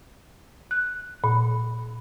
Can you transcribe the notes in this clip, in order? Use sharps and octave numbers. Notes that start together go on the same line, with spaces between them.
F#6
A#2